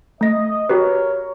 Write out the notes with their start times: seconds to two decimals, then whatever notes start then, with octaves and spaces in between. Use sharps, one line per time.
0.21 A3 D#5 A#6
0.69 F#4 G4 A#4 B4 C#5